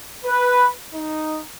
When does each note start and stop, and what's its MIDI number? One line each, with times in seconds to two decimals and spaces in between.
0.25 0.67 71
0.94 1.40 63